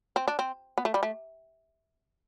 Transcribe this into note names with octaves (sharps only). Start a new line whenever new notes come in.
C4
D4
C4
B3
A3
G3
A3